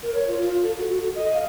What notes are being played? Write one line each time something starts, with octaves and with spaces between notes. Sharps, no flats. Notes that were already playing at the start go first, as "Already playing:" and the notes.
A#4
C#5
F4
F4
A4
F#4
F#4
A4
D#5
F5